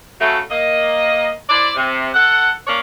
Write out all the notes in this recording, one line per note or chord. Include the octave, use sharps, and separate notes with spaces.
C#3 F#3 A3
A#3 D#5
E4 C5 D5
C3
A4 F#5
A#3 C#4 A#4 C#5 D5